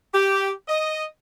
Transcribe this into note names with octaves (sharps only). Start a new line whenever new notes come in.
G4
D#5